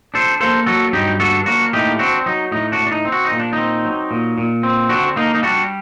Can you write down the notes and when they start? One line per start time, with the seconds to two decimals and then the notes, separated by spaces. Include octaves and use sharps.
0.14 D4 A4 C5
0.40 A#3 A4 C5
0.67 F#3 F#4 A4
0.93 G2 D#4 G4
1.20 D4 F#4 A4
1.46 A#3 D4 F#4
1.73 A2 D#4 G4
1.99 C4 D4 F#4
2.26 F#3 D#4
2.52 A2 D#4
2.72 D4 F#4
2.79 A2
2.87 D4
2.92 D#4
3.05 C4
3.12 F#4
3.25 D#4
3.32 A#2
3.40 D4
3.53 D#4
3.58 C4
3.85 F#3
4.11 A#2
4.38 A#2
4.63 C4
4.89 D3 D4 F#4
5.16 A#3 D#4
5.35 D#4
5.43 G3 D4 F#4